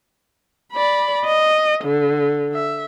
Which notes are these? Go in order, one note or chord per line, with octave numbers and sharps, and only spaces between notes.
D5 B5
D#5
D3
E5